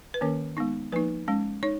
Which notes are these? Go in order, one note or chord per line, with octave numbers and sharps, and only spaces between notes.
B4
D#3 A#3 C#4 A#4
G#3 B3 D#4
F3 A#3 D#4 B4
G#3 C#4
D#4 C#5